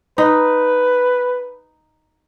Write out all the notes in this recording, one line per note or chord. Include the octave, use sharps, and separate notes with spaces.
D#4 B4